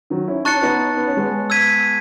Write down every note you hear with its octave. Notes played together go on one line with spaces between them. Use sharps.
D#3 F#3
C#4 E4
D#4 A5 C#6 F#6 A6 C#7
C#4
B3 D#4
B3
C#4
G#3 B3
E6 G#6 B6 D#7